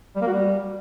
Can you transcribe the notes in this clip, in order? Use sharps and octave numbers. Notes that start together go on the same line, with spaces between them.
G3
A#3
F#4
G3